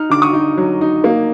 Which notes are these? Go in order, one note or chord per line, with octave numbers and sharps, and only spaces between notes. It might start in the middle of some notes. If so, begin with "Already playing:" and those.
Already playing: D#4 F6
D3 D6
C#6 D#6
D#4
F#3
D#4
A#3